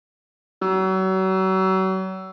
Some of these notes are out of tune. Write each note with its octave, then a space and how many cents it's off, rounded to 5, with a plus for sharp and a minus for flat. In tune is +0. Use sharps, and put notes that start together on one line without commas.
F#3 +35